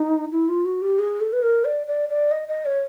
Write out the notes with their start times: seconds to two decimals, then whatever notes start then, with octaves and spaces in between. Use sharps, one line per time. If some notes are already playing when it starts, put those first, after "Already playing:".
Already playing: D#4
0.32 E4
0.49 F4
0.65 F#4
0.82 G4
0.99 G#4
1.21 A4
1.33 B4
1.42 A#4
1.65 D5
1.87 D5
2.09 D5
2.31 D#5
2.48 D#5
2.65 C#5